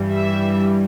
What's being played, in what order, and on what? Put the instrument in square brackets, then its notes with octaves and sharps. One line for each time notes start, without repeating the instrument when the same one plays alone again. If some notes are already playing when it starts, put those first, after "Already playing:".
Already playing: [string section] G2 E3 G3
E5